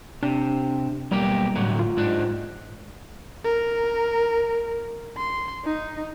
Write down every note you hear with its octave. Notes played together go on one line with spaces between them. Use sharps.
C3 D4
B1 G3 A#3 G4
A2 D3 F#3
F4
G#2 D4
A#4
C6
D#4